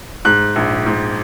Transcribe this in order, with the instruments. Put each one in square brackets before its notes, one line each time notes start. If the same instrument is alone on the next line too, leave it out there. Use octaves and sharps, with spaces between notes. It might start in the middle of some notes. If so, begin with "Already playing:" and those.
[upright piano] G#2 F#6
A#1
G#2